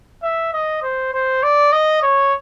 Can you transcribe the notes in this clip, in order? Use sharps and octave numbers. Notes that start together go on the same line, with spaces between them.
E5
D#5
C5
C5
D5
D#5
C#5